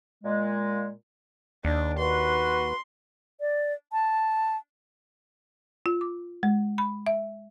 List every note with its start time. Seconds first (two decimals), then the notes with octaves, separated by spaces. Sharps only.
0.23 A#2 G#3
1.65 D#2 D4
1.99 F#4 B4 C6
3.40 D5
3.92 A5
5.86 F4
6.01 D6
6.43 G#3
6.78 B5
7.07 E5